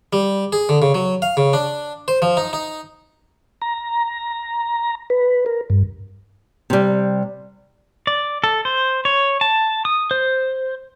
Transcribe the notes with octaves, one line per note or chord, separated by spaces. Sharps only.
G3
G#4
D3
C#3
F#3
F5
C#3
D4
C5
F3
D#4
D#4
A#5
B4
A#4
G2
C3 G3
D5
A4
C5
C#5
A5
D#6
C5